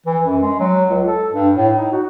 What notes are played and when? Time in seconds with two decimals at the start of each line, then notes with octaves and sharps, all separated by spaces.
0.06 E3
0.24 F#2
0.42 G#3
0.60 F#3
0.90 C#2
1.06 A4
1.32 G2
1.56 A2
1.77 D#4
1.92 F#4